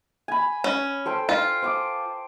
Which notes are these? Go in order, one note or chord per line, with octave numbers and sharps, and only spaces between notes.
G#5 B5
C#4
A4 C5 G5
F4
C5 D6 D#6